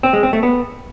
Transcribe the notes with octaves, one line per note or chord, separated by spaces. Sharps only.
C4
G#3
C4
A3
B3